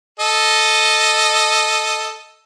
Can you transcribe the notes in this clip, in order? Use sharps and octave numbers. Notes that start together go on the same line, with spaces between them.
A4 D#5